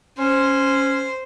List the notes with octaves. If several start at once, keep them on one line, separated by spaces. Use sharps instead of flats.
C#4 C5